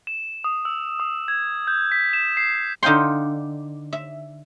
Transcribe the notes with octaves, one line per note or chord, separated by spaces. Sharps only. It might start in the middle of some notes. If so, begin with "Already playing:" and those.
E7
D#6
E6
D#6
G#6
G6
B6
E7
C7
D3 D#4 F5 G5 C6
E5